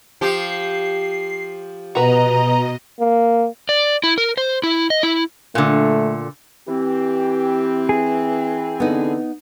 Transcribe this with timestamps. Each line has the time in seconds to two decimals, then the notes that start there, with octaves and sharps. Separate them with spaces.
0.21 F3 G4 C7
1.95 B2 F#4 B4 D#5 A#5
3.00 A#3
3.69 D5
4.04 E4
4.18 A#4
4.37 C5
4.63 E4
4.90 D#5
5.03 E4
5.55 A#2 D3 A3
6.69 E3 C4 G4
7.89 G#4
8.80 D3 B3 D#4